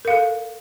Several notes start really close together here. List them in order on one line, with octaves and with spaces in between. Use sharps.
A#4 F5 A4